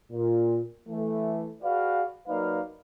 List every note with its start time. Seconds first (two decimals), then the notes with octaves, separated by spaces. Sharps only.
0.11 A#2
0.88 E3 A3
1.63 F#4 G#4 B4 D5 F5
2.28 F#3 A#3 D#4 B4 D5 F5